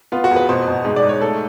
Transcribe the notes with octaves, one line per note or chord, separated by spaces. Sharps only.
B3 F4
F#4
E2
B4
B2 C5
B2
G#2
D5
G#2
C#5
A3 A4